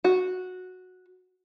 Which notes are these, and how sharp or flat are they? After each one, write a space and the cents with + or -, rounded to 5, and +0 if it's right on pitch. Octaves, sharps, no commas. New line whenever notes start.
F#4 -10